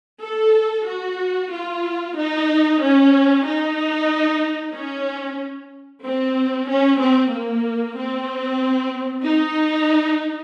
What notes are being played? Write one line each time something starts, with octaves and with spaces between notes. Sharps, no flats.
A4
F#4
F4
D#4
C#4
D#4
C#4
C4
C#4
C4
A#3
C4
D#4